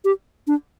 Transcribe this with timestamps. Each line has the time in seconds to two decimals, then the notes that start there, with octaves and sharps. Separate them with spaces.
0.05 G4
0.47 D4